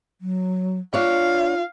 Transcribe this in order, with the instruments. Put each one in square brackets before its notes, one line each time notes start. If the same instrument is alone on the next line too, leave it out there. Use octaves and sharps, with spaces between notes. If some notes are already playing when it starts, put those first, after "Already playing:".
[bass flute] F#3
[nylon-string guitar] D4 C#5 [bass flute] F4 [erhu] F5